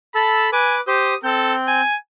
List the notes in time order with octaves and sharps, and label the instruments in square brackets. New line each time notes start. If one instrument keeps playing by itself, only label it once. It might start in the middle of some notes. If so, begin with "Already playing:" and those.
[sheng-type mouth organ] A4 A5 E6 [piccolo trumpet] B5
[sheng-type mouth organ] B4 D6 [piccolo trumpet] G#5
[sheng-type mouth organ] G4 C5 G6 [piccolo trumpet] D#6
[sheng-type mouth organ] C4 G6 [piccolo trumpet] A4
[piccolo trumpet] G#5